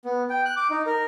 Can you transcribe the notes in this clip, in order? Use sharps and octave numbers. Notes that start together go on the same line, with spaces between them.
B3
G5
F#6
D6
D#4
A#4